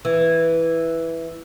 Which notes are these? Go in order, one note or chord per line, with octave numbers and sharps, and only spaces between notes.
E3